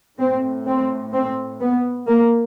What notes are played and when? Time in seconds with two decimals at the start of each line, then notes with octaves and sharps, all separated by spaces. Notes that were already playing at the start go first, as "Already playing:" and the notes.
0.19 A2 C4
0.66 C4
1.13 C4
1.61 B3
2.07 A#3